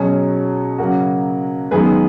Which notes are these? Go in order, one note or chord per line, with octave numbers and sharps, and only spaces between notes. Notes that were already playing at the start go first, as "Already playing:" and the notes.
Already playing: B2 F#3 C#4 G#4
C#3 F#3 A#3 F#4 A#4
F#2 D#3 G#3 B3 G#4 B4